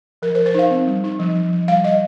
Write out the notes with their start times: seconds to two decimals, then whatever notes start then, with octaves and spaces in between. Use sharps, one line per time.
0.22 F3 A#4
0.35 C5
0.38 F3
0.46 C5
0.54 D#4 F5
0.70 C4
0.87 G3
1.04 D#4
1.19 F3
1.36 F3
1.52 F3
1.68 G3 F5
1.84 G3 D#5